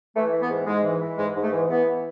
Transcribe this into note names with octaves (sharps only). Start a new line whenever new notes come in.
E3 A3
E3
B3
G#2
G#2 G#3
E3
E3
G#2 G#3
G#2
A3
E3
E3 B3